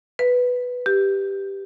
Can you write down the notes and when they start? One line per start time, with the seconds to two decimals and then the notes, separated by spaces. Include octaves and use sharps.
0.19 B4
0.86 G4